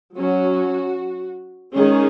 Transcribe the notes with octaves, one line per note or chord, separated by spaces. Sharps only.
F#3 C#4 F#4
D#3 G#3 C#4 G#4